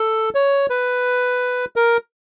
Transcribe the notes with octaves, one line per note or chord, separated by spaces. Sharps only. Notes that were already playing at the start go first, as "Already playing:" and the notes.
Already playing: A4
C#5
B4
A#4